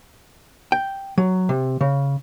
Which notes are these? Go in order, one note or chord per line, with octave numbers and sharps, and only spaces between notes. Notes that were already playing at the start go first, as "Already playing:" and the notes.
G5
F#3
C3
C#3